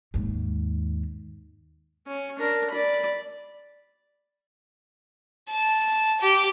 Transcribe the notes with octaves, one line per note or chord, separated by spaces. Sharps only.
D#2 G#2
C#4
D4 A#4
D5 B5
A5
G4